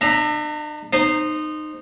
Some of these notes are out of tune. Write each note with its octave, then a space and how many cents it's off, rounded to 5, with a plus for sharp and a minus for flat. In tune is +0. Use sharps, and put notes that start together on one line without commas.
D4 +45 E5 +0 A#5 +0
D#4 -20 C5 +0